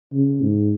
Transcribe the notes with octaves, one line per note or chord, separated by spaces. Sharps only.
C#3
G#2